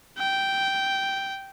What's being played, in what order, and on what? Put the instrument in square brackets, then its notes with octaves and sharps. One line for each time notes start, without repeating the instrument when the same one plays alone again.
[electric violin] G5